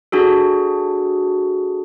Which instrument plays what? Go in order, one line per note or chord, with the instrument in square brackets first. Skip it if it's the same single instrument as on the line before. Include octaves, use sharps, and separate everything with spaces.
[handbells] D4 F#4 G#4 A4